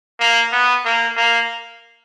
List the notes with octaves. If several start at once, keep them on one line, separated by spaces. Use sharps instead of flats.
A#3
B3
A#3
A#3